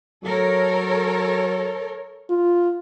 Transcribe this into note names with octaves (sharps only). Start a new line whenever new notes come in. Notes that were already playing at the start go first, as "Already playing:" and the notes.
F#3 A4 A#4 C#5
F4